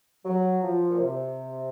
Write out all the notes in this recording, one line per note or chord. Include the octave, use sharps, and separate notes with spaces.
F#3
F3
A#2
C3